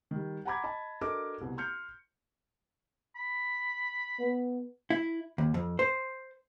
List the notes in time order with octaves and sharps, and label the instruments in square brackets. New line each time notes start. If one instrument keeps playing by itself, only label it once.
[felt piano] D#3 G3
F#5 G#5 A#5 B5 D6 G#6
D#5 A5 B5
D4 F#4 A4 A#4 D#5 D6
C2 B2
C6 F6 G6 C#7
[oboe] B5
[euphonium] B3
[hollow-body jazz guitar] E4
D#2
F2
C5